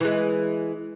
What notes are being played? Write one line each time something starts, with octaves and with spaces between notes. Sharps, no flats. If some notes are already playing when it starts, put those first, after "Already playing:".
E3 G#3